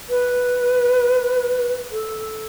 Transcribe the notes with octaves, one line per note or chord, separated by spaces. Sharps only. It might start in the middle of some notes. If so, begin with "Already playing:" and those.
B4
A4